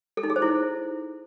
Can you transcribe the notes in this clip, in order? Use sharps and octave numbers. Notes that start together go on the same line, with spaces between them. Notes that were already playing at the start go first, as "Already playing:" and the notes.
A4
D#4
G#4
C5
E4